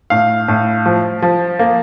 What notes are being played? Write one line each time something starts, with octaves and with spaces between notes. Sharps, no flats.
A2 F5
A2
F3
F3
A#3